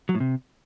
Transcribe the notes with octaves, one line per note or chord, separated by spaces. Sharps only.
F#3
A2
C3